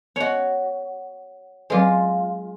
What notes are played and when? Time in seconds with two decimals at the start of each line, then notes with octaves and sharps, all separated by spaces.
0.16 B3 F#4 C#5 D#5
1.70 F#3 G#3 C4 F4 B4